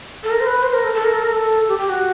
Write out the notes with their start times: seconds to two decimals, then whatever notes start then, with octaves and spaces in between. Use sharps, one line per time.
0.24 A4
0.31 A#4
0.40 C5
0.47 B4
0.62 C5
0.73 A#4
0.84 A4
0.94 A4
1.04 A#4
1.14 A4
1.23 A#4
1.32 A4
1.68 G4
1.78 G4
1.89 F#4